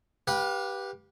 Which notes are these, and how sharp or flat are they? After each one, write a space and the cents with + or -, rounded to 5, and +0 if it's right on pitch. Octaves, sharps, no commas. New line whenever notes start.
G4 +0 B4 -15 F5 +35